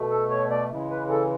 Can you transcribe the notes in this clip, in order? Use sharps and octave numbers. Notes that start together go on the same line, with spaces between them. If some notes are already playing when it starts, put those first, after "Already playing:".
Already playing: B2 A3
A4
C#5
D5
C#3 E3 G#3
B4
A4